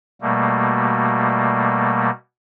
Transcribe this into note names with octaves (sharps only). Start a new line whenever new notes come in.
B2 G3 A3 A#3